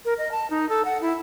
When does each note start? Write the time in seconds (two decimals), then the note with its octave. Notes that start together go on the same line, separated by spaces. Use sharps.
0.05 A#4
0.18 D#5
0.32 A5
0.50 D#4
0.69 A4
0.85 F#5
1.02 E4